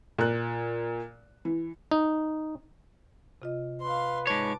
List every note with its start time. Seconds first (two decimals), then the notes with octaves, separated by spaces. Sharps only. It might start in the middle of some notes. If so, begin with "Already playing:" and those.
0.18 A#2 F#6
1.45 E3
1.91 D#4
3.42 C3 F4 D#5
3.82 B4 F5 C6
4.27 G#2 C#5 A5 D6